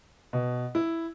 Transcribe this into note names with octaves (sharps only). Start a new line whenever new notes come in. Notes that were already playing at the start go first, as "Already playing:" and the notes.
B2
E4